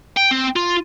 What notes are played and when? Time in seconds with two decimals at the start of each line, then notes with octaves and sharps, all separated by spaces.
0.17 G5
0.31 C4
0.56 F4